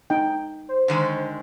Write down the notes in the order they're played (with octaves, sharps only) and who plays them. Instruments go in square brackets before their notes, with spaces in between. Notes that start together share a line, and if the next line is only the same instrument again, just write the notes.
[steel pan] D#4 G5
[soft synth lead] C5
[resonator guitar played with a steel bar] D3 D#3 G#3